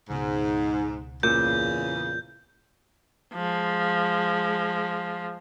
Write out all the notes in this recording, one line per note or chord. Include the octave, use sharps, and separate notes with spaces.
C#2 G#2 B2
E2 A#2 C#3 G6
F3 G#3